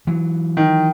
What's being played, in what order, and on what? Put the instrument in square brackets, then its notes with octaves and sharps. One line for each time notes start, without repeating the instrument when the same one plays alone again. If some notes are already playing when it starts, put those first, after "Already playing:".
[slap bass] E3 F#3
[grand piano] D#3